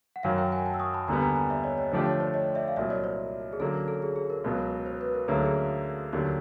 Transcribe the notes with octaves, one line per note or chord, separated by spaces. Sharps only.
F#5
F#2 D#3 F#3 F5 G5
F5 G5
F#5 G#5
G5 A5
E6
C#6 D#6
A5 B5
D#2 D3 G3 B3 G#5 A#5
G#5 A#5
G#5 A#5
D5 E5
C#5 D#5
C#5
D3 F3 A3 D4 G4 C5
C#5
C5 D5
C#5 D#5
D5 E5
F5
C2 A#2 F#3 D5 E5
C#5 D#5
C5 D5
G#4
D3 F#3 A#3 C#4 A4
A4
G#4
G#4
A#4
C#2 B2 F#3
C5
B4
A#4
D2 D3 F#3 A#3 C#4 G#4
A4
G#4
D#2 D3 F#3 G4